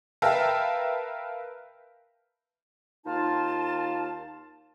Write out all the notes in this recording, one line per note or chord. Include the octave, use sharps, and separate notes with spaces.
A#4 B4 E5 F5 G5 A5
D#2 D#4 F4 F5 A5